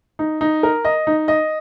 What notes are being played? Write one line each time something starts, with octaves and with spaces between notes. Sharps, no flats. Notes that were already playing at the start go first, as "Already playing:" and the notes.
D#4
D#4
A#4
D#5
D#4
D#5